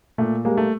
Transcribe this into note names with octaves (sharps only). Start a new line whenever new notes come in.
A#2 A3
G3 G#3 A#3
A3